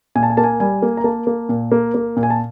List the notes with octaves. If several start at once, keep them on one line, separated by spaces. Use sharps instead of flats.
A#2 G#5
A5
G#5
A#3 A5
G#5
G3 G#5
A#3
A#5
A#3 A5
A#3
A#2
A#3
A#3
A#2
G#5
A5